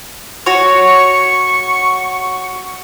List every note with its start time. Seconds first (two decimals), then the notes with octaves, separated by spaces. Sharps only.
0.46 F#4 C#5 C#6